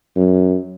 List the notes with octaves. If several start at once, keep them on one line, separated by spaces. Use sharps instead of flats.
F#2